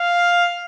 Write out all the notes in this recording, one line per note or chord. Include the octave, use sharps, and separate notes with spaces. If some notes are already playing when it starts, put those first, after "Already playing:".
Already playing: F5